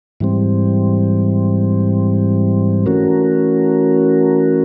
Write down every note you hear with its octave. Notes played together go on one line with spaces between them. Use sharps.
G#2 E3 G3 C4
E3 A3 C#4 F#4 A#4